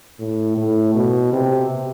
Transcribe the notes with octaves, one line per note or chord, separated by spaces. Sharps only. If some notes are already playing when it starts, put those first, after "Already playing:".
A2
A2
B2
C3